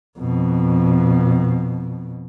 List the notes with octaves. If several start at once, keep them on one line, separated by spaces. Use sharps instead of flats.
F2 B2